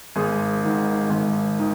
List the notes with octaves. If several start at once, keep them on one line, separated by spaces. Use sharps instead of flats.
G#1 G#4
G#2 D#3
G#1
D#3